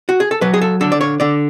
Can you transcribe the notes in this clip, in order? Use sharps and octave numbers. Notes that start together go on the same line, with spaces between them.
F#4
G#4
A4
F#3 B4
G#4
A4
D3 A4
D5
C#5
D3 D5